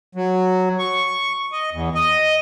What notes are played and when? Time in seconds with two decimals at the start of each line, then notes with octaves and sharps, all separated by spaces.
0.15 F#3
0.79 C#6
1.52 D#5
1.72 E2
1.95 D#5